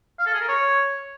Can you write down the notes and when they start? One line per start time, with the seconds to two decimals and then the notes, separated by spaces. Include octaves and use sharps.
0.19 F5
0.26 A4
0.34 G#4
0.41 A#4
0.48 C#5